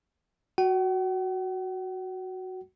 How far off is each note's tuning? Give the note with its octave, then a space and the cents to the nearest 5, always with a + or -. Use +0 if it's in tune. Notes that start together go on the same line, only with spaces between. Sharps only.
F#4 +0 F#5 +45